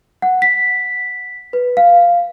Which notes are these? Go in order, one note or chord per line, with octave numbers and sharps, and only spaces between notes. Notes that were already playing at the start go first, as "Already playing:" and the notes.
F#5
B6
B4
F5